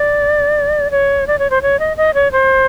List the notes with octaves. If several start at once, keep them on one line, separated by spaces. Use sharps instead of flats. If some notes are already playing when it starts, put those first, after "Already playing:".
Already playing: D5
C#5
D5
C#5
C5
C#5
D#5
D#5
C#5
C5